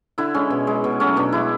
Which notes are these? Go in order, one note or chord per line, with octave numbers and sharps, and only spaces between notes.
D3 E4
G#3 C#4
B2
G#3
B2
F#3 A3 C#4
B2 D4
G#3 E4